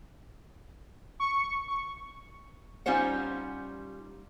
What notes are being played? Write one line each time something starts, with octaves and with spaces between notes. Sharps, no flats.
C#6
C#6
G3 C#4 D#4 F4 C5 F#5